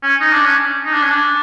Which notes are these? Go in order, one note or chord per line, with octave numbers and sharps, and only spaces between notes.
C#4
D#4
D4
C#4
D#4
D4
C#4
D4